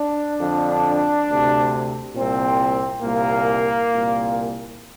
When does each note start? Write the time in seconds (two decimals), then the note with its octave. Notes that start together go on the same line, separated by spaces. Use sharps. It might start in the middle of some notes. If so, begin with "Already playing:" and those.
Already playing: D4
0.40 F2 D3
1.27 D2 C3
2.15 C2 A#2 C4
3.02 C2 A#2 A#3
3.90 C2 A#2